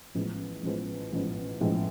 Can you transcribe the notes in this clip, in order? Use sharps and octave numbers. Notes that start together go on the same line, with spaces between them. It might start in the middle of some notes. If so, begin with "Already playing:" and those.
A1 A2 F3 G#3 B3
A1 A2 F3 G#3 B3
A1 A2 F3 G#3 B3
A1 A2 F3 G#3 B3